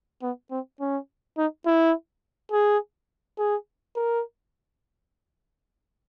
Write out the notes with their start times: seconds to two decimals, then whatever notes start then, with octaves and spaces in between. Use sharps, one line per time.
0.23 B3
0.51 C4
0.80 C#4
1.37 D#4
1.66 E4
2.52 G#4
3.38 G#4
3.96 A#4